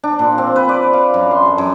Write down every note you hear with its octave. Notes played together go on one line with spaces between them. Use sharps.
D4
A#2
C4
B4
D5
F5
F#2
C6
A4
F#2